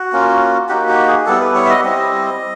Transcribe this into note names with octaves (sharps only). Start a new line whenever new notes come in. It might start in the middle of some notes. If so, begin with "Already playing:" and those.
Already playing: F#4
A#3 C#4 F4
A#3 D#4 F#4 G4
G4
G#4
G3 B3 E4 A4
B4
C#5
E5
D#5
G3 C4 E4 D#5